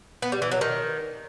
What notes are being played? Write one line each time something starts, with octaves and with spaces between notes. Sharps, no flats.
B3
G3
E3
F#3
D#3